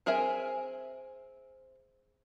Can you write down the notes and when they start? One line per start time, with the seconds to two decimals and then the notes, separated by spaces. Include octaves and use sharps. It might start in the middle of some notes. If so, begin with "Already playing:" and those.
0.06 C4 G#4 A#4 E5 G#5